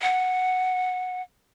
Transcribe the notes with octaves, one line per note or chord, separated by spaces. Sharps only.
F#5